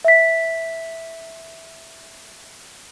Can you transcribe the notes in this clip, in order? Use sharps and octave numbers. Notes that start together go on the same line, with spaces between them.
E5 B6